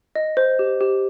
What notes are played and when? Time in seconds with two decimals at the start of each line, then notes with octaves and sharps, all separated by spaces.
0.15 D#5
0.37 C5
0.59 G4
0.81 G4